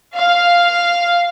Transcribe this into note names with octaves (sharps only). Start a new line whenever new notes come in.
F5